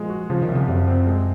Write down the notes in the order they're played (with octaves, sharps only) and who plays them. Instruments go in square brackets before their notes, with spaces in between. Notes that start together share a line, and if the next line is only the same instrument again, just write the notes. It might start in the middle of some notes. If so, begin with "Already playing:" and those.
Already playing: [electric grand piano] A#2 G#3 [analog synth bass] F3
[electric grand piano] F#4
[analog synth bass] C#3 [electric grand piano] F3
[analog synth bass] D#3
[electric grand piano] C2
[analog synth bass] C#3
[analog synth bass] F#2 [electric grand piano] C3
[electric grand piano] C4
G#3